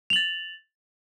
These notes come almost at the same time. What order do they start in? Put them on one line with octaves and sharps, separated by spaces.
F7 F#7 A6